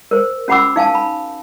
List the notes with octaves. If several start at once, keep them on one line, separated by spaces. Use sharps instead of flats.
A#4 C5
C#4 F#4 F#5 B5 D6 E6
D#4 F5 G#5 A5
B5